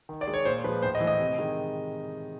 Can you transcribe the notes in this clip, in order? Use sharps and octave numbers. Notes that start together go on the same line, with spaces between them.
D#3
D5
G#3
C#5
A#2 C5
F3 G#3 B4
A2 C5
D#5
E3 A3
D#5
C3
D#3 G#3